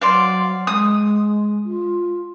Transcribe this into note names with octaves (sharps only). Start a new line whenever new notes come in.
F#3 C5 D5 F5
G#3 D#6
F4